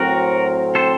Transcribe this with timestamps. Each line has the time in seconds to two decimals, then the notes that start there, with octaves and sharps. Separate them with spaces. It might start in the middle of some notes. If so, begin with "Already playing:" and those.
Already playing: A2 F#3 C4 F#4 A#4
0.75 A4 C5